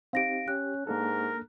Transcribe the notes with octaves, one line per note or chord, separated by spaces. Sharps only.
C4 D#4 G4 F5 A#6 D7
C#4 G4 F#6
G#2 A#3 D4 A4 A#4